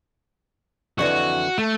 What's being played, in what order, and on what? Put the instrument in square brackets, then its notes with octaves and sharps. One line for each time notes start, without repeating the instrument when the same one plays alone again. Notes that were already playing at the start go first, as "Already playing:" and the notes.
[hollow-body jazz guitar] F2 D3 E3 [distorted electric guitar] F#4
[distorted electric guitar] A3